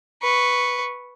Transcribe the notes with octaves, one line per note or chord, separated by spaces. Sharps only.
B4 C#6